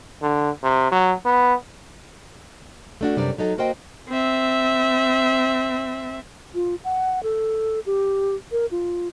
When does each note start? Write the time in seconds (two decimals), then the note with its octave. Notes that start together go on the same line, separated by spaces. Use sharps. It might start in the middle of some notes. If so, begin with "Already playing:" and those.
0.22 D3
0.63 C3
0.92 F#3
1.26 B3
3.01 A3 D4 F#4
3.16 F#2 C3 G3 D4 A#4 D5
3.38 F#3 D#4 A4
3.58 A#3 F#4 A#4 C5 D#5 G5
4.09 C4 E5
6.55 F4
6.84 F#5
7.23 A4
7.86 G4
8.52 A#4
8.71 F4